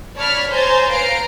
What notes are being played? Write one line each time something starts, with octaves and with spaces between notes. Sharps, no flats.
C#5 D5 A5 B5 F6 B6
C5 C#5 G#5 A#5 G6 A6
B4 F5 A#5 C7 D7